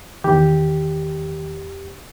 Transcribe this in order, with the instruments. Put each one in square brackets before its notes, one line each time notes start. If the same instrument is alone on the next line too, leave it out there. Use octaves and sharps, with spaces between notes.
[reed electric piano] E2 G4 [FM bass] D#3